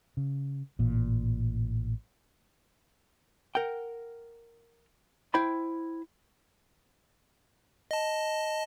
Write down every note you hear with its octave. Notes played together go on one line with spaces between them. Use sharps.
C#3
A1 A#2
A#4 F#5 G5
E4 C5 G5 B5
D#5 A5